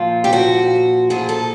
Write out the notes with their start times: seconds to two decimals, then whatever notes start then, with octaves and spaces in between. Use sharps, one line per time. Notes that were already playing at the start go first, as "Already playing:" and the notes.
Already playing: A#2 F3 F4
0.24 G4
0.33 F#4
1.10 A#2 F3 G#4
1.29 A4